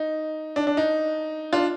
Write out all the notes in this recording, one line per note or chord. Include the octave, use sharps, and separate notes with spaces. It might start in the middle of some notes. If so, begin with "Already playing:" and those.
Already playing: D#4
D4
D4
D#4
D4 F4